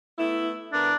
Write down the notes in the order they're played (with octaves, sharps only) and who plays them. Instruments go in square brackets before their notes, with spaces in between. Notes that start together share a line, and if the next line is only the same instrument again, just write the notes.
[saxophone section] A3 B3 E4
[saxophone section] D3 B3 A#4 [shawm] D4